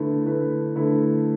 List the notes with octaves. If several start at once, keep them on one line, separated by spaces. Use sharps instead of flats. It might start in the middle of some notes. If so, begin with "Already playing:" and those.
Already playing: D3 A3 E4 B4
D3 A3 E4 B4
D3 A3 E4 B4